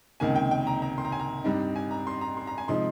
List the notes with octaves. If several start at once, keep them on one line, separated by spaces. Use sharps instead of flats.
C#2 C3 D#3 A#3 G#5
G5
G5
A#5
A#5
C6
A#5
G#5
A#5
G2 G3 C4 D#4
G#5
A#5
C6
A#5
C6
A#5
G#5
C3 F3 G#3 D#4 C6